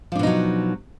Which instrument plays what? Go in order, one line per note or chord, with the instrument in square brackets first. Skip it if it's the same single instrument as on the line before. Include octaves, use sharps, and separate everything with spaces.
[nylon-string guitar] F3
D4
B2
D#4
F#3